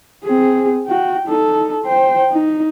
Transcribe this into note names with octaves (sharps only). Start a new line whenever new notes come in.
C4 G#4
F#4 G5
D#4 A4
C5 G5
D#4